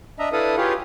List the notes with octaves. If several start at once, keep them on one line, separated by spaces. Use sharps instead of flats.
D4 D#5 E5 A#5
D4 E4 A4 B4 F5 D#6
F4 G4 G#4 B4 C#5 F5